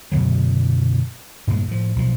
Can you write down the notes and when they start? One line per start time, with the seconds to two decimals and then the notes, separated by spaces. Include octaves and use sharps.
0.12 F#2 B2 D3 F#3
1.47 G2 A#2 C#3 G#3
1.68 A2 F3
1.96 B1 F3